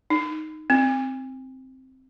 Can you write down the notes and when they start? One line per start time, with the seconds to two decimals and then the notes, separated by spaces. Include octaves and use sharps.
0.10 D#4
0.70 C4